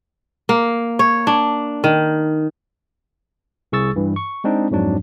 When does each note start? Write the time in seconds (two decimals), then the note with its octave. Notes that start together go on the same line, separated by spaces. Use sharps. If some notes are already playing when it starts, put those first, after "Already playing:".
0.49 A#3
0.99 C#5
1.27 D4
1.84 D#3
3.72 C2 G#4 C#6 E6 A6
3.96 G2 E3
4.16 C#6
4.44 G#3 C4 D4 D#4
4.71 F2 G#2 F#3 D4